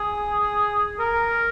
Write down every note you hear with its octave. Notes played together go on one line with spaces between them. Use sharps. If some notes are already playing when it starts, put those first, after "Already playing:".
Already playing: G#4
A#4